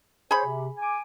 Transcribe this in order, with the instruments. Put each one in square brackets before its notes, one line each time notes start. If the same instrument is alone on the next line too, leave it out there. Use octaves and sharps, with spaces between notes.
[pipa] G#4 B5 [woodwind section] C5 C#5
[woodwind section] C3
G#5 D6